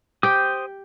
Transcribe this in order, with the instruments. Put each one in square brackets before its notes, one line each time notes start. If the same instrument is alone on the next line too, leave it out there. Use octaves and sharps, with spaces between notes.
[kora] G4 [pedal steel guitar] C5 G5 D#6